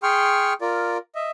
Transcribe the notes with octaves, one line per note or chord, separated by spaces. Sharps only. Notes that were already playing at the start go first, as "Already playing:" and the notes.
G#4 G5 C6 C#6 F6
F4 A#4 D5
D#5 E5